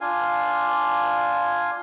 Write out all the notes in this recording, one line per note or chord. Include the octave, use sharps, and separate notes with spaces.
D4 F4 F5 G#5